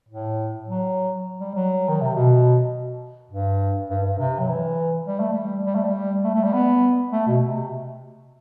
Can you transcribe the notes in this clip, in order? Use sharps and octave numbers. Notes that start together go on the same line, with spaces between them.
A2
F#3
G3
F#3
D#3
C3
B2
G2
G2
G2
C3
F#3
E3
G3
A3
G3
G3
A3
G3
A3
A3
G3
B3
A3
B2
C3